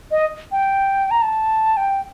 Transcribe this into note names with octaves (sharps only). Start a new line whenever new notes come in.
D#5
G5
A#5
A5
G5